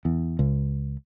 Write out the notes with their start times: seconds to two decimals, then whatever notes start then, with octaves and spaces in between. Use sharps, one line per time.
0.05 E2
0.39 C#2